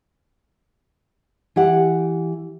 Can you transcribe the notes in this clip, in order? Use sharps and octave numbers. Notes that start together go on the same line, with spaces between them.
E3 G4 F#5